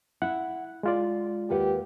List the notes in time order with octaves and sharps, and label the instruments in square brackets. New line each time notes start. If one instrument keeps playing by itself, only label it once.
[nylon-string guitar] E4 [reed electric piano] F#5
[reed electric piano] G#3 F4 D5
[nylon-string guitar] D#2 B4 F#5 [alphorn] G4